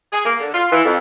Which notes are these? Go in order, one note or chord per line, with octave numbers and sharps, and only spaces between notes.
G#4
A#3
D3
F4
E3
F2